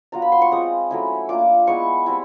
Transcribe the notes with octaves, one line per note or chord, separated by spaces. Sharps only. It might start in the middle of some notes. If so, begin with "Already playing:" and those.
F#3 B3 D4 F4 A#5
B5
C6
C#6
G#3 C4 F4 D#6
F#3 A3 C#4 E4
A#3 D4 F4 D6
G#3 B3 E4 C#6
G3 C4 E4